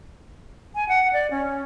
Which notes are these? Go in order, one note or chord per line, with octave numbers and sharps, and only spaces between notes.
G#5
F#5
D5
C#4